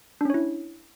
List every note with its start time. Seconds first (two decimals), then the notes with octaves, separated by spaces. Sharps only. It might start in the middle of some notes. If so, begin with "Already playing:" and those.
0.21 D4
0.25 C#4
0.30 C#5
0.34 E4